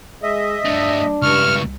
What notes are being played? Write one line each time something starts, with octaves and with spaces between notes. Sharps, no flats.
G#3 D#5 E5
G2 A3 D4
C#2 G2 E4 C#6 F6